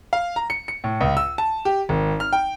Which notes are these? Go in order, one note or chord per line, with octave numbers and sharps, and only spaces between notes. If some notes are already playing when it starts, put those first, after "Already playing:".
F5
A#5
C#7
C#7
A2
C#2
E6
A5
G4
G#1
F6
G5